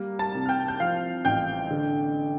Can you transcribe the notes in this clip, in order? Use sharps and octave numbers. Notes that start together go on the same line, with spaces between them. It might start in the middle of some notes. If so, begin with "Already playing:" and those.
Already playing: G3 A#3
A5 A6
C2
F6
G5 G6
G6
F3 F5 F6
A1 G5 G6
D3